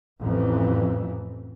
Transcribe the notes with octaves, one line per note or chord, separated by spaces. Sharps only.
A1 F2 E3